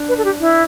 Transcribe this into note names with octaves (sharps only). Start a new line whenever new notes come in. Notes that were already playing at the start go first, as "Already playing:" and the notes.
Already playing: D4
B4
A4
G4
E4